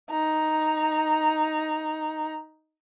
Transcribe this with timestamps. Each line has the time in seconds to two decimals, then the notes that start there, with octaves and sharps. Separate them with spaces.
0.10 D#4 A#5